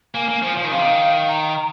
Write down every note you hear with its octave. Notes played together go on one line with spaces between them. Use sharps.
A#3 G#5
A#3
F3
F3
D#3
C3 F5
D#3
A#5